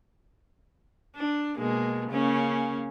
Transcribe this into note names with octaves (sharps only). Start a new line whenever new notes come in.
D4
B2 G#3 A#3
C#3 A#3 C#4